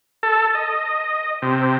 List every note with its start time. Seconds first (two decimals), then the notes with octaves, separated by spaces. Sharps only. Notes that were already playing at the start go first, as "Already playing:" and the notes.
0.23 A4
0.55 D#5
1.42 C3